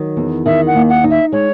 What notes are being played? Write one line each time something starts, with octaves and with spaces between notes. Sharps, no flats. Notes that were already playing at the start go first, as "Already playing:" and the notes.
Already playing: D#3 F#3
E2
D#3 E5
F#5
D#2
F#5
D#4
E5
G#3 C#5